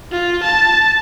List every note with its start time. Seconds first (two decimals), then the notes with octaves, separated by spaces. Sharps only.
0.12 F4
0.44 A5